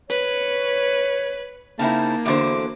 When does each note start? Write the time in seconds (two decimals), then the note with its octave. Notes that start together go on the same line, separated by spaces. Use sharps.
0.10 B4 C#5
1.79 C#3 A#3 C4 D#4 E4 A5
2.26 E2 D3 F#4 C5 D6